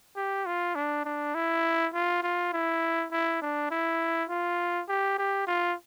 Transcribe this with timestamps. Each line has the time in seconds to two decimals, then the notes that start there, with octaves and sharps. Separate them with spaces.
0.16 G4
0.46 F4
0.75 D4
1.05 D4
1.35 E4
1.94 F4
2.23 F4
2.53 E4
3.12 E4
3.42 D4
3.71 E4
4.29 F4
4.89 G4
5.18 G4
5.47 F4